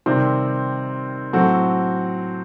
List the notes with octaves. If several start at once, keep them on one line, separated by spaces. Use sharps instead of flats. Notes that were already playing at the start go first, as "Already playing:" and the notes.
C3 D#3 G3 C4
A2 F#3 C4 F#4 A4